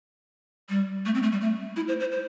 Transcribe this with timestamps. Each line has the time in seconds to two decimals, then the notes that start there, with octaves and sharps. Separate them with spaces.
0.69 G3
1.06 A3
1.14 C4
1.23 A3
1.32 G3
1.41 A3
1.76 E4
1.88 C5
2.00 C5
2.12 C5